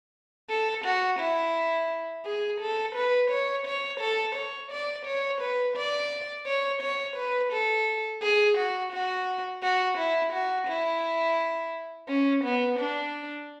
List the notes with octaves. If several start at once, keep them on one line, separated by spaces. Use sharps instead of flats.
A4
F#4
E4
G#4
A4
B4
C#5
C#5
A4
C#5
D5
C#5
B4
D5
C#5
C#5
B4
A4
G#4
F#4
F#4
F#4
E4
F#4
E4
C#4
B3
D4